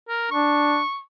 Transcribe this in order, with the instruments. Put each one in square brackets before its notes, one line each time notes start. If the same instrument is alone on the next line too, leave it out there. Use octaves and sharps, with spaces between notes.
[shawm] A#4
[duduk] D4 [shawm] C#6